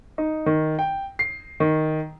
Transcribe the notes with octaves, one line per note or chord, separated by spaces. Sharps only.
D#4
D#3
G5
C7
D#3